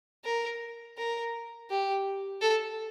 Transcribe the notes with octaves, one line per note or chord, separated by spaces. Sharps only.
A#4
A#4
G4
A4